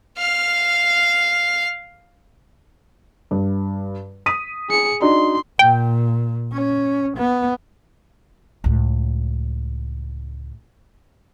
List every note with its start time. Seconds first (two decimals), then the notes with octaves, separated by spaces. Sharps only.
0.18 F5 F6
3.31 G2
4.26 D#6 B6 D#7
4.69 G#4 C#7
5.02 D4 D#4 F#4 C6
5.59 A#2 G5
6.53 C#4
7.17 B3
8.64 C#2 A2